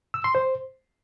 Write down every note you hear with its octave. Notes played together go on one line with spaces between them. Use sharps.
E6
C6
C5